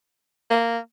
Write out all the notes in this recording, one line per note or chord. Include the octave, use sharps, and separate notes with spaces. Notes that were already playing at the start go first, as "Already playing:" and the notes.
A#3